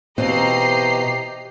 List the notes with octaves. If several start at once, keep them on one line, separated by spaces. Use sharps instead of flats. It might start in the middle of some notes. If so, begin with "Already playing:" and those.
B2 E3 C4 F4 G4 D#5 A#5 C7